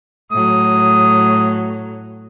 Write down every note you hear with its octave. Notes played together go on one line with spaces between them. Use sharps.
A2 F#3 D#6